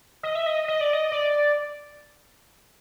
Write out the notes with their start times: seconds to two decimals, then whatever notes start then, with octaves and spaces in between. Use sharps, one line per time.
0.23 D#5
0.35 E5
0.46 D#5
0.68 D#5
0.81 D5
0.93 D#5
1.12 D5